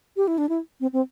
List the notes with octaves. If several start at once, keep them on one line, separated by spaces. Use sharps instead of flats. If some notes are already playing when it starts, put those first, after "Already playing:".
G4
E4
D4
E4
C4
C4